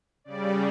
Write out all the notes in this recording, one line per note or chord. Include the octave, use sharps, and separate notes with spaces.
C#3 G3 D5